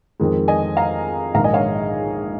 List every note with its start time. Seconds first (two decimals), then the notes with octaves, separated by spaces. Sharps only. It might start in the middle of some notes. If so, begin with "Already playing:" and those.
0.20 F2 D#3 G#3
0.48 D#5 G#5
0.77 F5 A#5
1.34 A#1 G#2 D#3 G#3 F5 A#5
1.44 D#5 G#5
1.53 C#5 F5